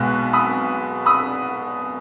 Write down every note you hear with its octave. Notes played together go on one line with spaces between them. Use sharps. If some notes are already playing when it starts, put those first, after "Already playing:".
Already playing: B1 B2 G#3 B3 F#6
B5 D#6
B5 D#6